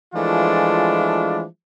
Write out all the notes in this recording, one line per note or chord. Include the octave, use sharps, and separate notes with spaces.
E3 F3 G#3 A3 D4 F4